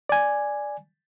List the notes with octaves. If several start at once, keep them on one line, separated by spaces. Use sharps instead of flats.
D5 G#5